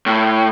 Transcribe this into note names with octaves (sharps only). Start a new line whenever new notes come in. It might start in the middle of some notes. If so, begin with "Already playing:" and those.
A2